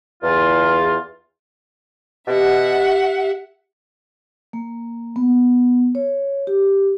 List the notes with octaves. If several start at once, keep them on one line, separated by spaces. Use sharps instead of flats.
E2 F4
B2 G4 E5 F#5
A#3
B3
C#5
G4